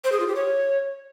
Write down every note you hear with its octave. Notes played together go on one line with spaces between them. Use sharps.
C5
G#4
F4
G4
C#5